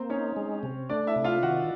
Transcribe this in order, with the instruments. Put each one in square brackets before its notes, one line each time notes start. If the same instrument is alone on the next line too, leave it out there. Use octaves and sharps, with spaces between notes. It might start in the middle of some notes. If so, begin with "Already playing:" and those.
Already playing: [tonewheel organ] A#3 [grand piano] C4 C5
[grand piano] C#4 C#5 [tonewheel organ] D#4
[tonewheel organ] G#3
C3
[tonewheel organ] A3 [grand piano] D4 D5
[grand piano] E4 E5
[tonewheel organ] C3
[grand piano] F4 F5
[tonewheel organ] D#3 [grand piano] F#4 F#5